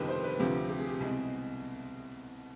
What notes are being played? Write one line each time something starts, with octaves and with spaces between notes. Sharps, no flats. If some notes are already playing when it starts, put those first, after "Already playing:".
Already playing: G1 F2 C3 D#3 G4 B4
C5
B4
D2 C3 F3 G4
G4
G#4
G4
C2 B2 G#3 C4 G#4